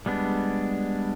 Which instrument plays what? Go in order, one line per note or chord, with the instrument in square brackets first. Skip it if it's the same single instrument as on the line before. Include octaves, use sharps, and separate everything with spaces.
[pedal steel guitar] G3 G#3 B3 D4